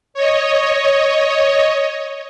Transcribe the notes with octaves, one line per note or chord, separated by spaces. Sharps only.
C#5 D#5